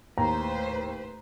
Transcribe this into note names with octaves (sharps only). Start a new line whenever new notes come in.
D#2 A2 B4 C5 A#5